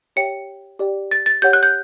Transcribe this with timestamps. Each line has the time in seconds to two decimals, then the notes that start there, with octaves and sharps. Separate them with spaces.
0.16 G4 C#5 E5 G5 C#7
0.79 G4 D5 G5
1.11 A6
1.26 A6
1.42 G4 C#5 F#5 G6
1.53 F#6
1.63 G6